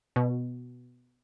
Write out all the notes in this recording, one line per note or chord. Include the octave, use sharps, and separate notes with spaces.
B2